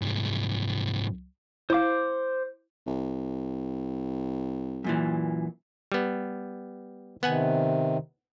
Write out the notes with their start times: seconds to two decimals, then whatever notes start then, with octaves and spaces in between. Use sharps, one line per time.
0.02 C2 G#2
1.70 E4 C5 F5 D6
2.86 C2
4.84 F#2 A#2 E3
5.92 G3 B3
7.23 C3 D#3 B3 F#5 G#5